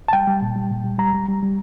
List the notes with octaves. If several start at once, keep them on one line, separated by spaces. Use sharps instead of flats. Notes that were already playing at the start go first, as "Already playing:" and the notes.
A5
G3 G5
G3
A#2
G3
A#2
G3
G3 A#5
G3
G3
G3